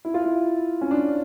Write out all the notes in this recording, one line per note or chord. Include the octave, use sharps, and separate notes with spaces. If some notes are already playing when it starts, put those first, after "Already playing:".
E4
F4
E4
C#4
D4